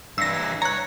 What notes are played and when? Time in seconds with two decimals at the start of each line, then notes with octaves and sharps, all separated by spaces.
0.18 G2 E3 E6 A#6
0.62 C#5 A#5 F#6